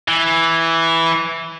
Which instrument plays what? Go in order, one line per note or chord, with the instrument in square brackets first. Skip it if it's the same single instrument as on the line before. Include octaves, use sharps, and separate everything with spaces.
[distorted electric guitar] E3